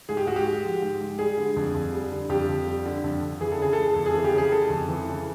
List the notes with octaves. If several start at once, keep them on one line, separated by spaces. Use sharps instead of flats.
G#2 G#4
G4
G#2 F#4
G4
G#3
F3
G#2
G#2
G3 G#4
D3
F2
F2
G3
D3
F2 G4
F2
G3
D3
F2
F2
E3 G#4
A4
C#3 G#4
G#3 A4
G#4
F2 A4
G#4
E3
G4
C#3 G#4
G#3 A4
F2
E3
C#3